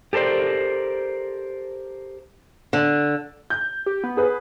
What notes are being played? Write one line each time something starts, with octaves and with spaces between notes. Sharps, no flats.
G4 A4 A#4 C5 D5
D3
G6
G4
B3
G#4 B4